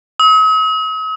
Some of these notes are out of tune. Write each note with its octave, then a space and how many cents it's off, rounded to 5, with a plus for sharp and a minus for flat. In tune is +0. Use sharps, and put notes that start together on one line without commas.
D#6 +45